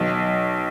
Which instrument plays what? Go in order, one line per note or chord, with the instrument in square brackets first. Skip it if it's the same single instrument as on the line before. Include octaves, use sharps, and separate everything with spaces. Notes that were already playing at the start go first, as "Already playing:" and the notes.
Already playing: [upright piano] B1